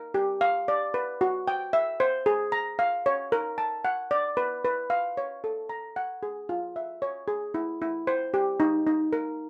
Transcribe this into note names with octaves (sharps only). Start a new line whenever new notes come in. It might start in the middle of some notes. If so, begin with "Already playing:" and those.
Already playing: A#4
G4
F5
D5
B4
F#4
G5
E5
C5
G#4
A#5
F5
C#5
A#4
A5
F#5
D5
B4
B4
F5
C#5
A4
A#5
F#5
G#4
F4
E5
C#5
G#4
E4
E4
C5
G4
D#4
D#4
A#4